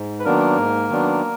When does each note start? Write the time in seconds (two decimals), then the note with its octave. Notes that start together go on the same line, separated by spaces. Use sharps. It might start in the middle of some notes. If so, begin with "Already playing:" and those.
Already playing: G#2
0.19 B4
0.25 D#3 F#3 A#3 B3 D4 A#4
0.58 G#2
0.89 D#3 F#3 B3 D4